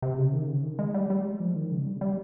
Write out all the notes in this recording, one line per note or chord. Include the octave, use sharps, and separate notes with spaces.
C3
C#3
D#3
C#3
D#3
G#3
G3
G3
G#3
F3
D#3
C#3
G3
G3